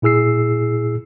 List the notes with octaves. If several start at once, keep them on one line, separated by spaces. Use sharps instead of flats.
A#2 E4 G#4 E6 C7